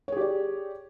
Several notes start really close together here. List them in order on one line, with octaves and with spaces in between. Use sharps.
C#5 G#4 G4 D5